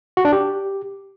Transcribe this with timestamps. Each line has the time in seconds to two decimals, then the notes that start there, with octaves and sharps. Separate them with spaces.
0.17 F#4
0.25 D4
0.33 G4